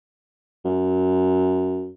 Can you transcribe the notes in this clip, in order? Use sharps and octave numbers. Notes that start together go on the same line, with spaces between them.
F#2